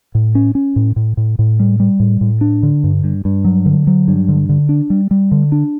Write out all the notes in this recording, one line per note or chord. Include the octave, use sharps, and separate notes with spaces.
A2
C#4
C#4
A2
A2
A2
A2
G3
G3
A2
A2
D4
D3
G2
G2
G2
F#3
D3
F#3
G2
D3
D3
D4
G3
G3
D3
D4